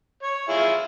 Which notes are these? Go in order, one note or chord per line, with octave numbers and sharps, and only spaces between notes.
C#5
E4 F4 G#4